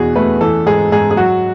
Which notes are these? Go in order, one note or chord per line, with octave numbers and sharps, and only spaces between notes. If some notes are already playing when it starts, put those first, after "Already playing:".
Already playing: E2 B2 F#4 G#4
A3 B4
E3 A4
G#2 G#4
G#2 G#4
G#4
F#3 F#4